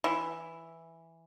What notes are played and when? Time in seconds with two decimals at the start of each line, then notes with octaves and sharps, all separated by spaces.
0.04 E3